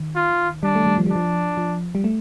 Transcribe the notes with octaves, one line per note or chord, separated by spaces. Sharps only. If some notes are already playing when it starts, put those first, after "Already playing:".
Already playing: D#3
F4
G3 D4
A3
G3
F3
G3
F3 D4
F3
G3
A3